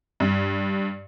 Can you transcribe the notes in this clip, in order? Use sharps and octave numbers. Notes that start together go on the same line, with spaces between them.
G2